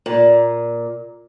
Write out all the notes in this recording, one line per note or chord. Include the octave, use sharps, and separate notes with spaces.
A#2